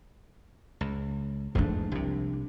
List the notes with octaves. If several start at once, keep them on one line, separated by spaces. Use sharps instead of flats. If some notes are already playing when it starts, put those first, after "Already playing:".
C#2
E2 G#2 F3 A3 D4
C2 C3